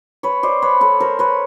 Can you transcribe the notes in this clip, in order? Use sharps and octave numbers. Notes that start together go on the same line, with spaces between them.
B4 C#5
C5 D5
B4 C#5
A4 B4
A#4 C5
B4 C#5